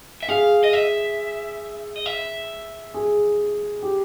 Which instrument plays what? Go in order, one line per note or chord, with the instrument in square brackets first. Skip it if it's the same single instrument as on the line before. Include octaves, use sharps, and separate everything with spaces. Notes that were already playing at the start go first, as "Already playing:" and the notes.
[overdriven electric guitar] E5
[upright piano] G#4 [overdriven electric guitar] F5
[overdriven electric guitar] D#5
E5
D#5
E5
[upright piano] G#4
G4